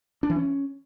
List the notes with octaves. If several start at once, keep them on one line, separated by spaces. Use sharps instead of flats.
D4
E3
C#4